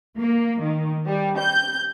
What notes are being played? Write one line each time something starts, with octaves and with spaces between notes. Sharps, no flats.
A#3
D#3
G3
G6